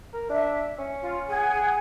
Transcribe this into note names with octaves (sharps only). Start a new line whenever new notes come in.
A#4
D4 E5
C#4
F4
G#4 F#5 G#5